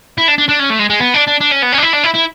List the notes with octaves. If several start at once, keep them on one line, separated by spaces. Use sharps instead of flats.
E4
D4
D4
D4
C#4
A3
G#3
G#3
B3
D4
D4
D4
C#4
B3
C#4
D4
E4
D4
E4
E4